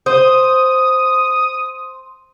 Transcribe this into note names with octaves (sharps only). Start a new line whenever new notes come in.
C5 D#6